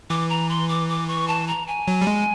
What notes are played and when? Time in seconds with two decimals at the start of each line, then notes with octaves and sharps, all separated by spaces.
0.10 E3 D6
0.29 A#5
0.50 C6
0.68 D6
0.89 D6
1.08 C#6
1.28 A5
1.48 A#5
1.67 G#5
1.88 F#3
2.01 G3
2.07 G#3